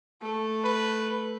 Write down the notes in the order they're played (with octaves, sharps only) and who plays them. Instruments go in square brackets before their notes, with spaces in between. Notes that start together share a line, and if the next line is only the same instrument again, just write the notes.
[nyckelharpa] A3 A4
[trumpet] B4